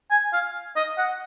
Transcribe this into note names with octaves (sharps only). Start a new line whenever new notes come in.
G#5
F5
D#5
F#5